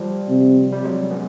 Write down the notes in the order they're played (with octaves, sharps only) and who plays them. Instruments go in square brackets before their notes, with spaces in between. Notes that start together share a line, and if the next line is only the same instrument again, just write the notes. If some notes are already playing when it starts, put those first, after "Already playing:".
Already playing: [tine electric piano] F3 G3
[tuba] C3
[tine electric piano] G3
F#3 G#3
B3 C#4